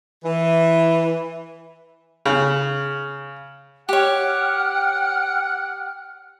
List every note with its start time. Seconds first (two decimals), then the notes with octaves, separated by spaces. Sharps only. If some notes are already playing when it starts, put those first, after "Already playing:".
0.24 E3
2.26 C#3
3.89 G4 C#5 F#5 G5 F6